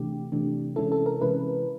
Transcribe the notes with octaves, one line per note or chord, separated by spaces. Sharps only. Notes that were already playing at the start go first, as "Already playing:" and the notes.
Already playing: C3 E3 A3 D4 G4
C3 E3 A3 D4
C3 E3 G#3 C#4 E4 A4
A4
A#4
C3 E3 G#3 C#4 E4 B4